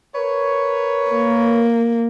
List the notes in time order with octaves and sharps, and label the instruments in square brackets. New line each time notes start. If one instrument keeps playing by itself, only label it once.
[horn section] A#4 B4 C#5
[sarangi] A#3